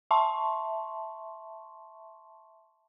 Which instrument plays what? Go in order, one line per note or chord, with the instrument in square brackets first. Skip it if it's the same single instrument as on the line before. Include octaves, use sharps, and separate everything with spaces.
[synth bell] E5 A5 C6 C#6